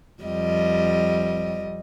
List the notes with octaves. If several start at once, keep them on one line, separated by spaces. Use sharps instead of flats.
F2 G3 D#5